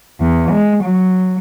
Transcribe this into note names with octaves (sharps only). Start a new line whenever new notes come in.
E2
G#3
F#3